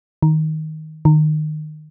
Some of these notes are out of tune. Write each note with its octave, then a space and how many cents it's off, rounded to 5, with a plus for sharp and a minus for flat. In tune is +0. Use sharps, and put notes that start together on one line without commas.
D#3 +10
D#3 -20